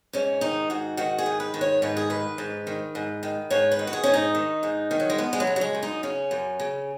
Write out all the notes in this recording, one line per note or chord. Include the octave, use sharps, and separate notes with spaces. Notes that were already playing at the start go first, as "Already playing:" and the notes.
G#2 C#4
D#3 D#4
G#2 F#4
D#3 F#4
G#4
G#2
B4
D#3
C#5
G#2 B4
G#4
D#3 B4
G#2
D#3
G#2
D#3
G#2 C#5
B4
D#3
F#4
G#4
G#2 C#4
D#4
D#3
G#2
D#3
F#3
G#3
F#2 B3
G#3
F#3
C#3
F#3
G#3
F#2
D#4
C#3 C#4
F#2
C#3